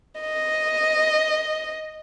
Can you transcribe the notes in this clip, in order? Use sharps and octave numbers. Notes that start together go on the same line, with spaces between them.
D#5